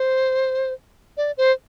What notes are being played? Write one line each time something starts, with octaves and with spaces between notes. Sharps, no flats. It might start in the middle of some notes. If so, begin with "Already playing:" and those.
Already playing: C5
D5
C5